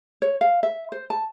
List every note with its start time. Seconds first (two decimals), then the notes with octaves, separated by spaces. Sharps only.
0.22 C#5
0.41 F5
0.63 E5
0.92 C5
1.10 A5